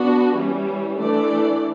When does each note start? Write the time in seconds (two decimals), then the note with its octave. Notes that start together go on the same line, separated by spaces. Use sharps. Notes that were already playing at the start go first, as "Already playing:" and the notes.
Already playing: B3 D4 F#4
0.36 E3 G3 C#4
0.99 E3 A3 D4 A4 D5